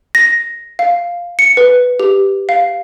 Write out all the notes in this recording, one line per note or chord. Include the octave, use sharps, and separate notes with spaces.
A#6
F5
C#7
B4
G4
F5